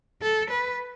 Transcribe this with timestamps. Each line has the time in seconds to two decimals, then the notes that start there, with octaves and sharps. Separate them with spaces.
0.22 A4
0.50 B4